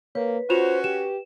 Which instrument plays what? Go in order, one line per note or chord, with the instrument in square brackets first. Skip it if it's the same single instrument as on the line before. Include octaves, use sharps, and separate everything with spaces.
[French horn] A#3 [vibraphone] B4 [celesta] C#5
[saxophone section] C#4 F#4 [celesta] F4 E7 F7 [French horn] C5
[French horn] G4 [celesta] E7